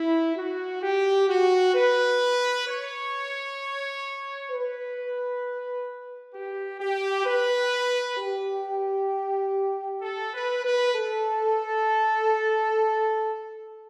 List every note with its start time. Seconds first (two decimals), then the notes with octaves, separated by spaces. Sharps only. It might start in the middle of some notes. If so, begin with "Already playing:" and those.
Already playing: E4
0.36 F#4
0.82 G4
1.28 F#4
1.74 B4
2.66 C#5
4.49 B4
6.33 G4
6.79 G4
7.25 B4
8.17 G4
10.02 A4
10.33 B4
10.64 B4
10.94 A4